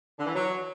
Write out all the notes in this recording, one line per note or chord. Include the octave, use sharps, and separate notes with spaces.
D3
E3
F#3